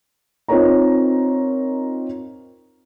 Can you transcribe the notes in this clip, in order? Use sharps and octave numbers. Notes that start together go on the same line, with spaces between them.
C4 D#4 F4 A#4 C#5 A#5